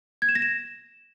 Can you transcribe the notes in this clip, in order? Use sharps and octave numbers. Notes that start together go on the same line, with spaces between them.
G#6
E7
A#6
E7